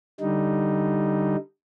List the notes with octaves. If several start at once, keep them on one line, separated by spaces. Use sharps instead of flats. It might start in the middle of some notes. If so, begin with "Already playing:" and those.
D3 G3 D#4